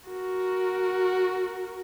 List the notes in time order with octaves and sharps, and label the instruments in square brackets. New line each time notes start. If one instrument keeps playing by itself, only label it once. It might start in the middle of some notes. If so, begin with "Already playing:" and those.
[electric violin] F#4 A#4